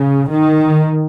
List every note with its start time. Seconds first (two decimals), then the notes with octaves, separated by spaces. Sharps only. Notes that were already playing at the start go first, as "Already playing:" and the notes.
Already playing: C#3
0.29 D#3